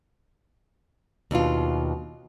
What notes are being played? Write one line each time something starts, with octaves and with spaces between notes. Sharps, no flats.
D#2 B2 D4 F4